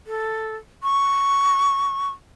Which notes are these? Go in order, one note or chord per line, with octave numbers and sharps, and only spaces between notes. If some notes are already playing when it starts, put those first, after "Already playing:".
A4
C#6